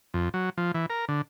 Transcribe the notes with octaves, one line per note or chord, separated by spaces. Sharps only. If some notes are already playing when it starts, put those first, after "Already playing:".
F2
F#3
F3
E3
A#4
D3